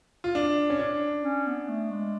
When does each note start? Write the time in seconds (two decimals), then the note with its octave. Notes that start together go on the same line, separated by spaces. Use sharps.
0.24 F4
0.35 D4
0.70 C#4
0.79 D4
1.24 C#4
1.47 B3
1.68 A3
1.90 G#3